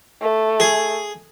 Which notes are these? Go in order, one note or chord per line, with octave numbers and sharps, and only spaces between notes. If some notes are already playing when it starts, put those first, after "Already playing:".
A3
G#4